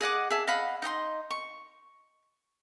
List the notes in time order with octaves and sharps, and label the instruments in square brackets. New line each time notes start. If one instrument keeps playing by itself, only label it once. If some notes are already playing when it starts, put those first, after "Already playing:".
[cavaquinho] G#4 D#5 F#5 D6
G#4 E5 A5
D#5 F5 F#5 B5
D#4 D#5 G5 C6
C#6